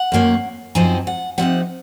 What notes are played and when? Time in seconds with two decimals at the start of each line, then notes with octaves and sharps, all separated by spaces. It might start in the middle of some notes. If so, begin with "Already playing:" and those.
Already playing: F#5
0.12 F#2 D#3 A#3 C#4
0.75 F#2 F3 C4 D#4 G#5
1.07 F#5
1.38 C3 F3 C4 D#4 F#5